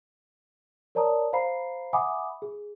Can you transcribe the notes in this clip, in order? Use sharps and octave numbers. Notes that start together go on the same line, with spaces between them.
A#4 C#5 D5 A5 A#5 D#6
C5 F5 A#5 B5 C7
E5 F#5 G#5 B5 D6 D#6
G#4